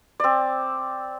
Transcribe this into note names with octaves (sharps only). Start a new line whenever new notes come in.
C4 D5